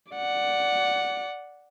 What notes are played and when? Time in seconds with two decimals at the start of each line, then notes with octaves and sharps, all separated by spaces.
0.12 D5 F#5